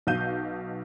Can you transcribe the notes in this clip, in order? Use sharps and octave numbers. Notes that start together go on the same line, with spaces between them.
B1 B2 F5 G6 D#7